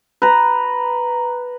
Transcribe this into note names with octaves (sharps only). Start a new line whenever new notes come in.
B4 A#5